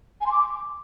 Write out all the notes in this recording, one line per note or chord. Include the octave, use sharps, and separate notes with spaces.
G#5
C6
D6